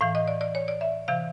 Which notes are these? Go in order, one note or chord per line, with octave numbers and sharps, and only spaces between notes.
A2 E3 F5
D#5
D5
D5
C#5
D5
E5
C3 E3 F5